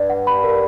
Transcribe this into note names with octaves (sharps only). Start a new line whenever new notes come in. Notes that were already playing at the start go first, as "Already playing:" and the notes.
Already playing: G2 D5
F#5
B5
A#4